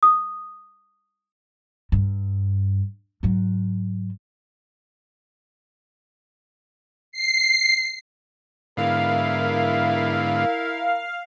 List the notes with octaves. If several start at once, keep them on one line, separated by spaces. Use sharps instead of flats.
D#6
G2
G#2 F#3
C7
G#2 D3 B3 E4 A#4 F5